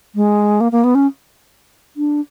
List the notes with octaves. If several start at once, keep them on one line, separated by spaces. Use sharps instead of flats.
G#3
A#3
A#3
B3
C#4
D4